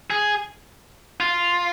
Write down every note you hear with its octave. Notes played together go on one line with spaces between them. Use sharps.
G#4
F4